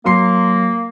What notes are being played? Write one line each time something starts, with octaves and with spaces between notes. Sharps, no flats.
F#3 A#3 C6 C7